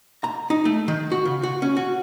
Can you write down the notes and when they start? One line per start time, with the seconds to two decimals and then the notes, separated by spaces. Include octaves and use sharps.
0.24 A#5
0.50 D#4
0.65 A3
0.88 D#3
1.12 F#4
1.25 C#3
1.43 F#4
1.62 C#4
1.77 F#4